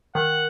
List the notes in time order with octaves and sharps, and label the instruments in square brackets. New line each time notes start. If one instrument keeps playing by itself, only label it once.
[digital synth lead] D#3 [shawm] F#5